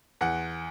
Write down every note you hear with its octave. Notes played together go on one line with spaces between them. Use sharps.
E2 F#5